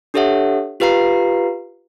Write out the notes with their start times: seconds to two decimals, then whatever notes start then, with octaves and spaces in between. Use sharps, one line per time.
0.14 D4 G4 A4 C#5 E5 F#5
0.80 F4 G4 B4 F5 A#5 C7